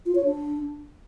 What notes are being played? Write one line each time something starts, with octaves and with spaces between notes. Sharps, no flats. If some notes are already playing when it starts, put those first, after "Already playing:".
F4
C#5
D4